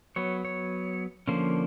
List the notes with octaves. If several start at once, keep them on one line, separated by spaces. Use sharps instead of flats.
F#3 B3 C#5
C#5
D3 F3 A#3 C#4 C5